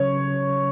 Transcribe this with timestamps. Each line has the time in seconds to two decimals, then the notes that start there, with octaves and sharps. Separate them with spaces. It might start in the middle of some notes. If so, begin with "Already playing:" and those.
Already playing: C#3 F#3 C#4 C#5
0.18 C#3